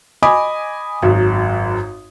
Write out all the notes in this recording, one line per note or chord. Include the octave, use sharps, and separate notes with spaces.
D#5 G#5 B5 D6 D#6
G#1 F#2